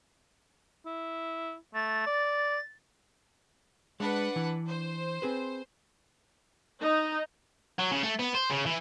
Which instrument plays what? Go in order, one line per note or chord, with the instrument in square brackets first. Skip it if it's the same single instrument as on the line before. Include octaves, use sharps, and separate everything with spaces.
[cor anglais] E4
[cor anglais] A3 [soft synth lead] A6
[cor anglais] D5
[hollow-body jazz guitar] G#3 [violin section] D4 B4 F#5
[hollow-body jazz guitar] E3
[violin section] C5
[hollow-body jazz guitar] C4 G#4 B4
[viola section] D#4
[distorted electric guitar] F#3
C#3
A3
B3
C5
C#3
E3